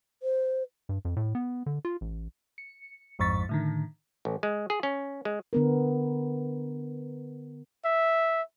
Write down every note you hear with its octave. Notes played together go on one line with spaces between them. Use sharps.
C5
G2
F2
A2
B3
D3
F4
A1
C#7
A1 F2 G#2 C#6 A6 B6
A2 D3 D#3
A1
G#3
G#4
C#4
G#3
D3 B3 A#4
E5